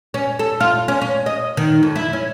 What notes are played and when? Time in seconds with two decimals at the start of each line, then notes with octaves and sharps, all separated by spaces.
0.14 C#4
0.39 A4
0.61 F4
0.88 C#4
1.01 C#4
1.26 D#5
1.57 D#3
1.83 F2
1.95 E4
2.13 C#4